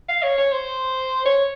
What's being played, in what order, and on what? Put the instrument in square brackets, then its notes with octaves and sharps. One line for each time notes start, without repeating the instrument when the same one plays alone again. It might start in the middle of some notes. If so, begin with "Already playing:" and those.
[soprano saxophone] F5
C#5
C#5
C5
C#5